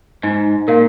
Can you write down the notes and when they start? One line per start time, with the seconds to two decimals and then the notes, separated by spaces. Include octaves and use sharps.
0.23 G#2 D#4
0.68 A#2 A#4 F5